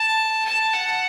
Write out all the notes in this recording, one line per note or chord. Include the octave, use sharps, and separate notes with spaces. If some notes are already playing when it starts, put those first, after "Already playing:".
Already playing: A5
A5
F#5